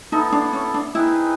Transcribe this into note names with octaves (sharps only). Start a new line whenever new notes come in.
B3 D#4 E4 A4
D4
C#4
D4
C4 D#4 E4 G#4 B4